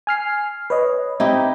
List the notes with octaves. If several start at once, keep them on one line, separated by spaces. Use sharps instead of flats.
G#5 F6 C7
B4 C#5 D#5
C4 D#4 E4 G4